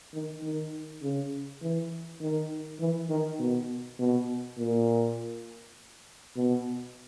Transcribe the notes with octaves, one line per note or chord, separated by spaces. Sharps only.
D#3
D#3
C#3
E3
D#3
E3
D#3
B2
B2
A#2
B2